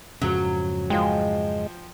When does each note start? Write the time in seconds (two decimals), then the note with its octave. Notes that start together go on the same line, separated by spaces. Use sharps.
0.22 F2 G#2 C#3 F#3
0.90 F3 G#3 F4 G5